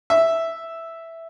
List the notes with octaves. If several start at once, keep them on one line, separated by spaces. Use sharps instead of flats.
E5